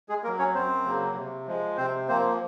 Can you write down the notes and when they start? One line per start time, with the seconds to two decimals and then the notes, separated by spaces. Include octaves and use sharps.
0.09 G#3 G#4
0.23 A#3 A#4
0.27 F#3
0.39 C#4 C#5
0.55 F#2 C4 C5
0.86 C#3 F#3 A#3
1.16 C3
1.46 F3 G#3
1.77 C3 C4 C5
2.08 F3 A#3 C4 C5